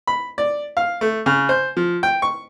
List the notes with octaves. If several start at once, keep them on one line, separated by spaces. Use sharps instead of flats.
B5
D5
F5
A3
C#3
C5
F3
G5
C#6